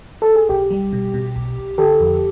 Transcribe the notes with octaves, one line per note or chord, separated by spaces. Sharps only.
A4
G#4
B1 G4
G3
B2
B2
B1
B1
D3 G4 A4
F2